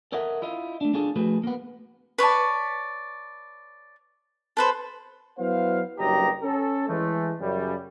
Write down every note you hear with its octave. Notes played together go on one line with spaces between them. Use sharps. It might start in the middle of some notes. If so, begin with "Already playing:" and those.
A4 A#4 C#5 D#5 E5 F#5
E4 F4 D#5 F5
A3 D4
C4 D4 F4 G#4 A4
F3 A3 F#4 G#4 B4
A#3 B3
B4 C#5 D5 A5
A4 B4 C5
F#3 B3 E4 C5 F5
F#1 G2 F#3 G4 D#5 A#5
C#4 A4
E3 G#3 A3
F#2 C#3 G3